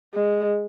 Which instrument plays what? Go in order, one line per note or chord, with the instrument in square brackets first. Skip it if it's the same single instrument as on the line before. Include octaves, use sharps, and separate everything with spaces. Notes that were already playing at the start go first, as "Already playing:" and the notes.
[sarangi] G#3